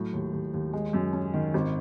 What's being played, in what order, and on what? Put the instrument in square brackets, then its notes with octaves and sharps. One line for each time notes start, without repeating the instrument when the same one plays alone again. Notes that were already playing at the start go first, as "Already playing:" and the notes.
Already playing: [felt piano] A2 F#3
D#2
D#2
D#2
G#3
F#2
C#4
D#3
G#1